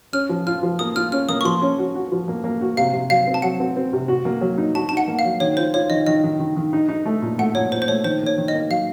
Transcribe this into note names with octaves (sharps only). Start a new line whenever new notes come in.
C#4 F6
F3
F4 F6
F3
A#3 D#6
F4 F6
C#4 F6
A#3 D#6
C#6
F3 C6
C#4
F#4
F#4
F3
A#3
A#3
F#4
C3 F5
C3
F#3 F5
C4
A5
F#3 F#5
C4
C4
C3
F#4
A#3
F#3
D#4
F#4 A5
A5
D#4
F#5
A#3
F5
F#3
D#3 C#5
F4 C5
F4 C#5
D#3 D#5
D#3 D#5
D#3
D#3
D#3
D#4
D#4
A3
A#2
A3 F#5
A#2 C#5
A#2 C5
C5
A3 C#5
D#3 C5
A#3
C#5
D#3
D#5
A#3
F#3 F5